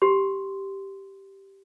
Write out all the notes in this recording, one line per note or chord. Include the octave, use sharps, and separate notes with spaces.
G4 C6